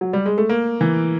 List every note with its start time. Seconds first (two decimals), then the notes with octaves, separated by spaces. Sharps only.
0.01 F#3
0.13 G3
0.26 G#3
0.38 A3
0.49 A#3
0.81 E3